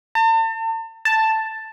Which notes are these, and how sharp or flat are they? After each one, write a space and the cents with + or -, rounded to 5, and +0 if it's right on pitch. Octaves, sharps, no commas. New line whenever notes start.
A5 +40
A5 +5